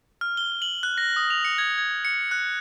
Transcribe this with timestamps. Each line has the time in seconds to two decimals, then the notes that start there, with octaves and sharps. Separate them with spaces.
0.21 F6
0.37 G7
0.62 F#7
0.83 F#6
0.98 A#6
1.16 D#6
1.30 F7
1.45 C#7
1.58 G#6
1.78 G#6
2.05 C#7
2.31 F#6